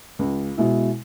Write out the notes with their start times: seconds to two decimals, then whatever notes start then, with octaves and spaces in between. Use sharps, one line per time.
0.19 C#2
0.58 B2 G#3 E4